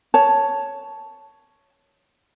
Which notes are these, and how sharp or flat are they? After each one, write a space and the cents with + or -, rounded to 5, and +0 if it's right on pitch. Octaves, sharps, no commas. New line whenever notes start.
C#5 +5 A5 +0